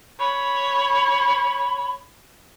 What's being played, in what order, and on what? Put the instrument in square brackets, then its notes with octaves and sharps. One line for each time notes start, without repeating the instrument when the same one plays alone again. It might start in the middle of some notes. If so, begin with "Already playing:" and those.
[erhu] C#5 [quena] B5